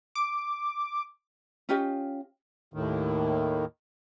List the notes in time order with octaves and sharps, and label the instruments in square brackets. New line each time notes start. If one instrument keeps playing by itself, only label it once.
[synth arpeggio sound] D6
[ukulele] C#4 F4 G4 D#5
[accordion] D#2 A2 D#3